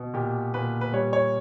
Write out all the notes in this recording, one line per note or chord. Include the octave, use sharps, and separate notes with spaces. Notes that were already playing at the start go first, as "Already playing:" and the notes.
Already playing: B2
A#2 G4
A#2 B4
B4
G3 C#5
C#5